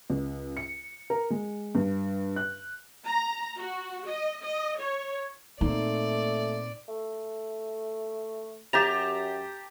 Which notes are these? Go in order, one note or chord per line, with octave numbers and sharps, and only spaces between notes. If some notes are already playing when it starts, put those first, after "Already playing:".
C#2
C#7
A#4
G#3
G2
F#6
A#5
F#4
D#5
D#5
C#5
A#2 A3 A#3 C4 D#4 D5
A3
F#2 G4 A5 A#5 G6 A6 F7